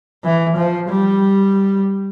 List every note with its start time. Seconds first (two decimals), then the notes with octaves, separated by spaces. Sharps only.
0.24 E3
0.57 F3
0.89 G3